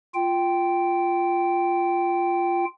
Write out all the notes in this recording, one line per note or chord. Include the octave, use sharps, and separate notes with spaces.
F4 G5